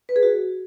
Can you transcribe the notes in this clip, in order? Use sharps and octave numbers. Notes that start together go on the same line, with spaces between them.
B4
G#4
F#4